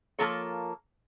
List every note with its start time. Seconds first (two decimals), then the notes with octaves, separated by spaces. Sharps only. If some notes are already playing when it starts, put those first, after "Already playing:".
0.19 F3 A#3 F4 A4 A#4 C#5